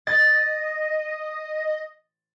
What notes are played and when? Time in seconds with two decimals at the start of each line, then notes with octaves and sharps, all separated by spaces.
0.07 D#5 A6